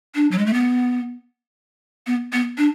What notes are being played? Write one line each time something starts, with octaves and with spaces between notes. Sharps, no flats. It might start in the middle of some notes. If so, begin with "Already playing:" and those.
D4
F#3
G#3
A3
B3
B3
B3
D4